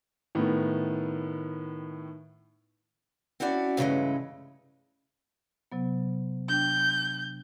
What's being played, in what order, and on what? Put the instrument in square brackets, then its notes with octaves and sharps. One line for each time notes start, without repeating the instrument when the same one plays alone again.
[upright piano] A2 D#3 B3
[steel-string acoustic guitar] C4 C#4 E4 F#4 D5
G2 C#3 E3 F3 G#3 A3
[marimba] C3 F#3 B3
[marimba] D4 G5 [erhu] G6